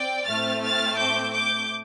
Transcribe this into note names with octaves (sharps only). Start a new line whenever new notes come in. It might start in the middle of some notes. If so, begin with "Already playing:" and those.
Already playing: C4 D5 G5
A2 A3 C4 F6 A6
F6 A6
D6 G6
D6 G6